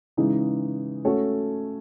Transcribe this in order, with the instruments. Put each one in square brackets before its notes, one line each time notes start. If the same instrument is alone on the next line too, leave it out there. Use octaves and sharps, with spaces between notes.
[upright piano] C#3 E3 G#3 D#4
A3 C#4 F#4 A4 C#5